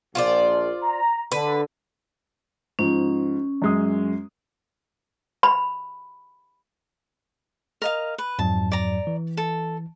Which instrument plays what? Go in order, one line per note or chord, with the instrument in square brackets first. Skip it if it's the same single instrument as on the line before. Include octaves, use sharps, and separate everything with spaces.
[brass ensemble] A#1 [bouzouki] F4 C5 D5
[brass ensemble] A#5
[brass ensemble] D3 [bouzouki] B4
[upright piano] G#2 F3 [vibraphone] C#4
[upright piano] F#2 G#3 D#6
[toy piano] B5
[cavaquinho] A#4 D#5 F5
B4
[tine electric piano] F2 G#2 F#3 [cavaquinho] A5
[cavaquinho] D5 A#5
[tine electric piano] E3
[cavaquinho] A4